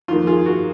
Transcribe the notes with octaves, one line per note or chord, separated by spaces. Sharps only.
F2 D#3 A#3 F4
F4 G#4
F#4 A#4